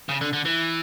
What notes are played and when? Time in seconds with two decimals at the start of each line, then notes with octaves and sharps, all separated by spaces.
0.09 C#3
0.21 D3
0.33 D3
0.45 E3